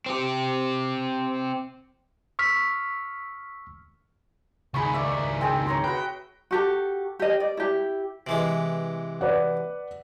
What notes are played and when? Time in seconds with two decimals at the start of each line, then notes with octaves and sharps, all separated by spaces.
0.06 C4 G4
2.39 C#6 E6 F6 B6
4.74 C#2 D#3 G#4 B5 C#6
4.94 D5 E5
5.41 C4 G#4 G5
5.67 C#5 A#5 C6
5.84 F#4 B4 G5
6.51 F#4 G4 A4
7.19 G4 D#5
7.40 D5
7.57 E4 G4
8.27 C3 E3 G#3
9.21 B4 D5 F#5